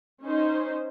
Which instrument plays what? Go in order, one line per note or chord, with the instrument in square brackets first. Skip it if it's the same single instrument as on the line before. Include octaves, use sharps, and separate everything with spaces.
[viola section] C#4 D#4 C5